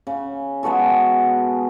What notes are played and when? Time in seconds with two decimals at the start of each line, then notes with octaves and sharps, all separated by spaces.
0.07 C#3
0.63 G#3 B3 F#4 A4